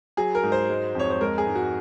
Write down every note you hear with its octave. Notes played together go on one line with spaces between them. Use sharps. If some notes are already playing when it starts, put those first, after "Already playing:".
F#3 G#4
A#4
G#2
C5
G#3
F2 C#5
C5
G#3 A#4
G#4
G#2
F#4